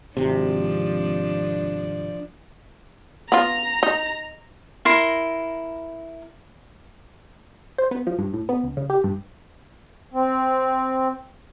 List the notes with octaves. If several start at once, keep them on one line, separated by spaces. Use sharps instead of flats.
G#1 C3 F3 D4
B3 F4 A#5
D#4
E4 A#4 A#5 C6
C5
B3
F3
G2
A2
B3
C#2
C#3
G4
G2
C4